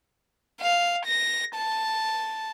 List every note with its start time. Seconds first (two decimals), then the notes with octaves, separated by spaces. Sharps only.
0.61 F5
1.05 A#6
1.56 A5